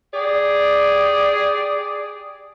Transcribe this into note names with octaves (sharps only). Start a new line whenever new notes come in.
G4 G#4 D5